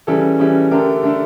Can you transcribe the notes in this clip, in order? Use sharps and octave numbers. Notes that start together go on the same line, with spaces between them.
C#3 E3 G3 C#4 A4
C#3 E3 G3 C#4
D3 A3 D4 G4 A#4
D3 A3 D4